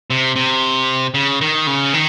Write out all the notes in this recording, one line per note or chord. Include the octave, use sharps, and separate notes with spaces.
C3
C3
C#3
D#3
C#3
D#3